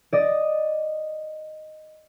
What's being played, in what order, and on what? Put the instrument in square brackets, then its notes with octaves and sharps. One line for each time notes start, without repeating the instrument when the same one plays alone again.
[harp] D5 D#5